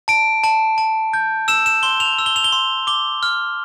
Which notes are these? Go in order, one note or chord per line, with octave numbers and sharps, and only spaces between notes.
A5 D7
A5
A5
G6
E6 E7
E7
C6 G7
F7
E6
G7
F7
G7
C6
D6 G7
F6